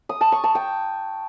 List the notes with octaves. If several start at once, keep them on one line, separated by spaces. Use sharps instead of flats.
D#6
A5
C#6
A5
G5